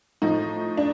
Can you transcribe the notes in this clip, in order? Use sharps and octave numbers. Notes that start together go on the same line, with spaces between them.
A2 F3 D#4
D4